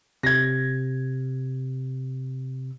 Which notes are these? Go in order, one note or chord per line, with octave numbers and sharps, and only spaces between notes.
C3 G#6 A#6